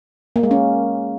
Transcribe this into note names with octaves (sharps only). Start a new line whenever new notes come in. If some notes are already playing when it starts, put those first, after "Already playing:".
A#3
G#3
C#4